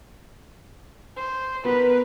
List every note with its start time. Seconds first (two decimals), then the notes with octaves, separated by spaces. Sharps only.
1.17 C5
1.65 B3 A#4 B4